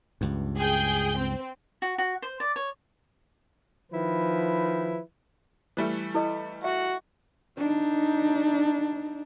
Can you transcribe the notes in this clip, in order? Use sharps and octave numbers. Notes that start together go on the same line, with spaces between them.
C#2 G2
G#4 G5 G6
C4
F#4
F#4
C5
D5
C#5
D#3 F3 E4 B4
E3 G3 A3
E4 A4 D#5
F#4 E5
D4 D#4